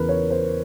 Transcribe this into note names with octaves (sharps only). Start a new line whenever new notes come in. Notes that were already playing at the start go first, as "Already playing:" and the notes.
Already playing: E2 C#3 E3 A#4 B4
C#5
C5